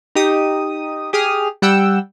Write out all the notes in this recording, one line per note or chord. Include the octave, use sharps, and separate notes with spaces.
D#4 G4 D#6
G4 G#4 D#6 F6
G3 F#5 G5 E6